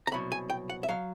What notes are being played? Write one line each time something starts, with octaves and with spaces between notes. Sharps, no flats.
A#5
C2 B2 F#3 B5
G#5
G5
F#5
E5
B2 F#3 F5